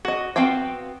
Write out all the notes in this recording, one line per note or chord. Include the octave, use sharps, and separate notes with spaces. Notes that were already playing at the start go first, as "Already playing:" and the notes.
F#4 D#5
B3 C4 F#4 F5 G5